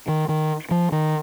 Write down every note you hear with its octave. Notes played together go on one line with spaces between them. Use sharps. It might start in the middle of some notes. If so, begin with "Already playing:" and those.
D#3
D#3
F3
D#3